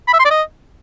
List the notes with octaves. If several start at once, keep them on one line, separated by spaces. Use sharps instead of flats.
B5
E5
C6
D5
D#5